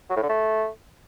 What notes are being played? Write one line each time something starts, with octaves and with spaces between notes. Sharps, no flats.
F#3
A2
D3
A3